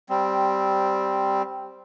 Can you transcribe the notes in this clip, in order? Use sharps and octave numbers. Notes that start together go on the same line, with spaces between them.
G3 C4